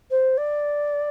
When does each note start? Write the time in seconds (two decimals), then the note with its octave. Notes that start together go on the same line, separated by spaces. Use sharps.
0.11 C5
0.37 D5